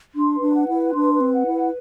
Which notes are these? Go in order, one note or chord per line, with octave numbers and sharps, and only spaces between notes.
D4 C6
B4
D4
F#5
E4
B4
D4 C6
B4
C4
F#5
E4
B4